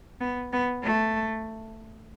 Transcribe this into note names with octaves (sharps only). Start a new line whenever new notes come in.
B3
B3
A3